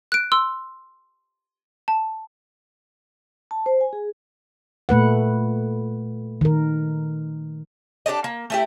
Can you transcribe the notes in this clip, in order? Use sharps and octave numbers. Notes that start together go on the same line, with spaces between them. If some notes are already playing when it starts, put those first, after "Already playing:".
F#6 D7
C6 E6
A5
A5
C5
G#5
G#4
A#2 A3 B4 F#5
D#3 A#4
D4 G4 A4 D#5
A#3
A3 E4 G4